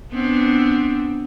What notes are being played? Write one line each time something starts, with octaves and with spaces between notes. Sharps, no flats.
B3 C4 D4